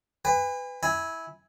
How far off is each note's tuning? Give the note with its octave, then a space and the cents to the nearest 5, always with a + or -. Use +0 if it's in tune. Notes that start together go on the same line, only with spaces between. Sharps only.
B4 +20 G#5 -40
E4 -15 G#5 +0